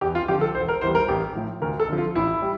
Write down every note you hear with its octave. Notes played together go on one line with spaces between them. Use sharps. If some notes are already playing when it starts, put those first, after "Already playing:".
E2 G4
F4
D3 F3 G4
A4
E1 C5
A#4
E2 E3 G3 C5
A#4
A1 G4
A2 F3
D2 A#4
A4
D3 F3
F4
A1 E4
G3